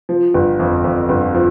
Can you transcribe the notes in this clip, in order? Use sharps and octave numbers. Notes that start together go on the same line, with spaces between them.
F3
G1
F2
F2
G1
F3